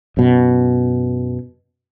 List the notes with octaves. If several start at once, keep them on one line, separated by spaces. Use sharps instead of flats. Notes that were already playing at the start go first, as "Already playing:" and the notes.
F#2 B2